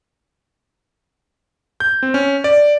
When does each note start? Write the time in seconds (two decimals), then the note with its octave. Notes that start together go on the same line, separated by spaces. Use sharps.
1.80 G6
2.03 C4
2.14 C#4
2.44 D5